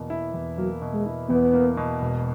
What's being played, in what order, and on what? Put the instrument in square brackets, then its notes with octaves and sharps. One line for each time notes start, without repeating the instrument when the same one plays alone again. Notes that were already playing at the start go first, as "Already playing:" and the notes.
Already playing: [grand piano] E2 B2 A#3
E4
E2
[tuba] F#3 [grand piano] A#3
[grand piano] B2
[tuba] G#3
[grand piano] E4
[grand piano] E2 [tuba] B3
[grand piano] A#3
B2
E1